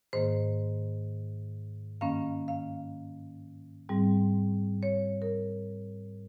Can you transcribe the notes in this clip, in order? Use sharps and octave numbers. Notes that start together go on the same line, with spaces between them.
G#2 D#3 A#3 C5
G2 D#3 A#3 C#4 F5
F5
G#2 G3 C4
C#5
A#4